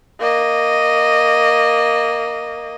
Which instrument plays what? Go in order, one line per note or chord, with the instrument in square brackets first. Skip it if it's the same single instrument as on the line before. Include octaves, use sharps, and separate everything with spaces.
[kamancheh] A#3 D#5